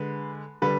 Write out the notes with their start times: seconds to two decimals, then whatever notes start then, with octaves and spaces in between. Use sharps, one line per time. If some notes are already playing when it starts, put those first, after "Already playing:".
Already playing: D3 G#3 B4
0.62 D3 G3 B4